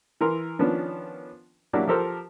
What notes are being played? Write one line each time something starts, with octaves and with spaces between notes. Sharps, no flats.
E3 A#4 C6
D#3 F3 B3 C#4 D4
F#3 A#3 D4 E4 G4 D5
F3 G4 A4 A#4 C5